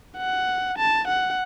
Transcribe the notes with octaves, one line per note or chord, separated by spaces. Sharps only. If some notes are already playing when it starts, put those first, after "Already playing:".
F#5
A5
F#5